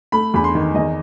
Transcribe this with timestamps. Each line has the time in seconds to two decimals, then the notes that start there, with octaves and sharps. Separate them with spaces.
0.12 A3 B5
0.34 E2 B5
0.44 C6
0.55 D#3
0.75 E2 D#5